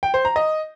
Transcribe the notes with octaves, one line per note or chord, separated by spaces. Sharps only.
G5
C5
A#5
D#5